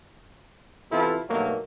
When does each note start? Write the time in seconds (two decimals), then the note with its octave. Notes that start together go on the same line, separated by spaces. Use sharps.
0.92 C3 E3 B3 E4 F4 A4
1.29 G2 B2 D#3 F#3 A3 A#3